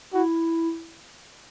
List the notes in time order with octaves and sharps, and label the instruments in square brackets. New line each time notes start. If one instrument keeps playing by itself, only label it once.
[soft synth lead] E4 [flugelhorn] F#4